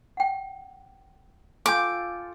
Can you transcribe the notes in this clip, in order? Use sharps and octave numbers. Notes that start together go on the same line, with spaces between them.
F#5 G5
F4 A4 G5 G#5 D6 G6